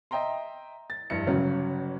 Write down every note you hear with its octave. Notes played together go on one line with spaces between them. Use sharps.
D#5 E5 G5 A#5 C6
A6
F1 G2 E4 E5 C#7
G1 C#3 F#3 C#4